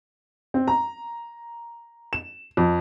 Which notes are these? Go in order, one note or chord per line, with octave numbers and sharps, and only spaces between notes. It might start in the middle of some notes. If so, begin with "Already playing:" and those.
C4
A#5
E7
F2